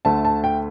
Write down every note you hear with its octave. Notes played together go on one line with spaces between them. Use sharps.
D2 D3 A3 A5
A5
G5